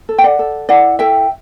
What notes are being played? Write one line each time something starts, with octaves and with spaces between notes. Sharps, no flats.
A4
G5
D5 F#5
A4
E4 D5 F#5
A4 E5 G5